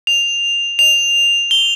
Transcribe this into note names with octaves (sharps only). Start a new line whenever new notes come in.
F7
F7
G7